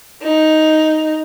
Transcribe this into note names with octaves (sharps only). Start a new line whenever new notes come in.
D#4